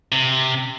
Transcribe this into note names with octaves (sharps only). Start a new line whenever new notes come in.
C3